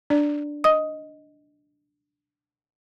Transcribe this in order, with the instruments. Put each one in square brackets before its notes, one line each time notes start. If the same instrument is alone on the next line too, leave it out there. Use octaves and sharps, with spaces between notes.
[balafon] D4 D5
[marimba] D#5 D#6